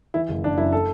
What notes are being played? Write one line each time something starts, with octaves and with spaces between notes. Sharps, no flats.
E3 E4
F#1
F#1 D4
F#2 E4
A4